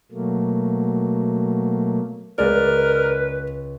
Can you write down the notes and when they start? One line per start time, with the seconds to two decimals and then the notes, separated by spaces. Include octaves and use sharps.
0.12 B2 F#3 A3 A#3
2.38 C#2 G#3 A#4 B4 D5